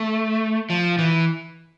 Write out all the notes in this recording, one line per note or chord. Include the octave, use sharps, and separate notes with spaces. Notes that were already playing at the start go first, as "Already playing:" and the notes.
Already playing: A3
F3
E3